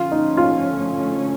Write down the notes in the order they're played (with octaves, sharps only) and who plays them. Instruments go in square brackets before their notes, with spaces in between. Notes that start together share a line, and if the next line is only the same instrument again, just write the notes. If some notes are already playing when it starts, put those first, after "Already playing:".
Already playing: [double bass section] D3 F3 A3 C#4 [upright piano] F4
[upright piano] D#4
F4